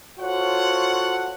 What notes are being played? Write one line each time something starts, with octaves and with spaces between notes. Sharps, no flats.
F4 F#4 A4 C5 C#5 F#5